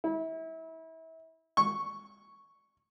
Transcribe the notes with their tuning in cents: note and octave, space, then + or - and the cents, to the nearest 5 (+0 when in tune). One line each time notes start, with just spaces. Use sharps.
E4 -30
C#6 +0